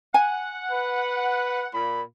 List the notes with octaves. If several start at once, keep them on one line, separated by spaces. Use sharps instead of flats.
F#5 G#5
B4
A#2 B5